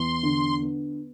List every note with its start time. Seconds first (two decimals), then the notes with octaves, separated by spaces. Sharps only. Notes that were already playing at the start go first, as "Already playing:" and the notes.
Already playing: E2 C6
0.23 D3
0.62 B3